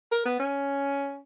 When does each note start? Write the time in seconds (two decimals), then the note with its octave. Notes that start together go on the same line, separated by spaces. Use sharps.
0.12 A#4
0.25 B3
0.40 C#4